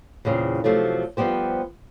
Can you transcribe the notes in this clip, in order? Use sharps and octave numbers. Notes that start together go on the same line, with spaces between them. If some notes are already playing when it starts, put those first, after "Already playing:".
E2 A#2 C#3 C4
C3 F3 F#3 A3
F3 G3 B3 G4 C5